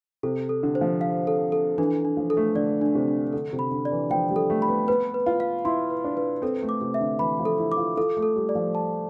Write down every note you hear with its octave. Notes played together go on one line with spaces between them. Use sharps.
C3 A4
A4
D3
C5
F3
F5
A4
A4
E3 D4
D4
F3
A4
A3
D3 D5
D4
C3
D4
D3 A4
C3
B5
D3
D5
E3
F3 G5
G3
A4
A3
B5
B3
B3 B4
B4
F4
F5
E4 C6
B4
D4
B4
C4 A4
A3
D6
C3
E5
D3
E3 B5
F3
A4
E4
D6
F4
F4 A4
A3
A4
G3
D5
F3
A5